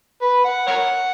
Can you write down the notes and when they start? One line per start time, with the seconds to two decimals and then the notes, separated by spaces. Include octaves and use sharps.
0.21 B4
0.44 F#5
0.67 A#4 C#5 F#5